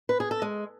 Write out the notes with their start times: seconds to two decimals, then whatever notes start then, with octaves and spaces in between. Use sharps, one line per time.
0.09 B4
0.20 G#4
0.31 A4
0.42 G#3